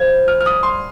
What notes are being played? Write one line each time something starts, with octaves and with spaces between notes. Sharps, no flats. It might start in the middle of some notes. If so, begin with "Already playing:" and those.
Already playing: F3 F4 G#6
F6
F6
G3 G4 D#6
C6